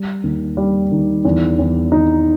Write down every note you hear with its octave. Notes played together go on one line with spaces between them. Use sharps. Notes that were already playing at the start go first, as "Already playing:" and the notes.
Already playing: G3
D#2
G3
D#3
E2
E2
D#3 D#4